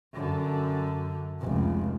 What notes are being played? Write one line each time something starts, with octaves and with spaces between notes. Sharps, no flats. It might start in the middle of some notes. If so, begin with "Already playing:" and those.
F#2 D3
F1 C#2